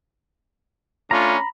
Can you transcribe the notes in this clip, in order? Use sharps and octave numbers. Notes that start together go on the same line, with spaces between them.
A3 C#4 D4 F4 A#5 B5